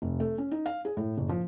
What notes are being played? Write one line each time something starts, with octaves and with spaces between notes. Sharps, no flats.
F1
A3
C#4
D#4
F5
G#4
A2
F#1
F3